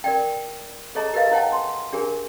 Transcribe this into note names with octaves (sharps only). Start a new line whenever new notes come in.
A#4 D5 G5
G#4 A4 C#5 D#5 A5 A#5
G4 A#4 B4 D#5 F5
E4 C5 C#5 F#5 G5 A5
C6
D4 G4 G#4 A#4 G#5